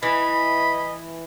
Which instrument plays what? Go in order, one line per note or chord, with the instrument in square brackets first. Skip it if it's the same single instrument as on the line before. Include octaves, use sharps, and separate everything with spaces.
[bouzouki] E3 [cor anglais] D#5 [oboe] B5